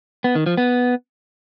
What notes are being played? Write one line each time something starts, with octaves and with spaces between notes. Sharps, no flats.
B3
D#3
F3
B3